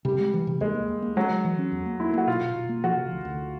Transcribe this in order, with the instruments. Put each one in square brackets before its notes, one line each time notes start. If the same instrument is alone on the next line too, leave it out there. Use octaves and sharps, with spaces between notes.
[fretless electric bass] C3 [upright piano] G3
[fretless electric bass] G#3
E3
C3
[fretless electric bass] D#2 [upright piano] G#3
[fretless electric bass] A#3
D#2
A#3
[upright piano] F#3 [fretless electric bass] G#3
[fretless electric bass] G#3
E3
C#4
E2
A#3
[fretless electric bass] A#3 [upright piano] E4
[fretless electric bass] A#3 [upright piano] F#4
[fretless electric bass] B2 [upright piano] F4
[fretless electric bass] B2
B2
A#3
[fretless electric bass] F3 [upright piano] F#4
[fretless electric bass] C3
D2
D2